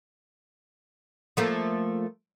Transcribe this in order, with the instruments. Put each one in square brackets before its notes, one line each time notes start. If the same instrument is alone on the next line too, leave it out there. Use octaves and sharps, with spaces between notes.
[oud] F3 A3 A#3